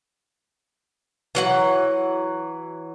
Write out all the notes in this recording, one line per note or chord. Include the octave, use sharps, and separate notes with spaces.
E3 F#3 F#5